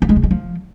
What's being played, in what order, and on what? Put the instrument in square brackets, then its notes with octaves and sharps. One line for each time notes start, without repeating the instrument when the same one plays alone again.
[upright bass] C4
G#3
C#3
G#3
F3